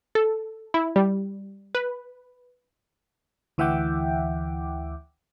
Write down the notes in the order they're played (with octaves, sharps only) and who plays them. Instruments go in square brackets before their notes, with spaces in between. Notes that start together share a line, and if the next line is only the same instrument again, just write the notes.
[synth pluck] A4
E4
G3
B4
[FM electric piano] D2 E3 E5 F#5 G5 D6